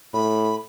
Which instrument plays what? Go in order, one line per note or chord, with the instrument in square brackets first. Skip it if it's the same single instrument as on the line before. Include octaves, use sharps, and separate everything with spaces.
[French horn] A2 [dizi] B5